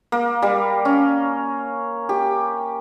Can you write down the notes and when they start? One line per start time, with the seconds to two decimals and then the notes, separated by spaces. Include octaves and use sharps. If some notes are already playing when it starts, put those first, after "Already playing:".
0.12 A#3
0.42 G3
0.85 C#4
2.09 G4